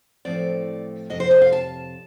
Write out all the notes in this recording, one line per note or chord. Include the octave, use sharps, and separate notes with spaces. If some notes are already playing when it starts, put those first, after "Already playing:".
A2 F3 A3 C4 D5
F2 C3 D#5
C5
D#5
F5
A5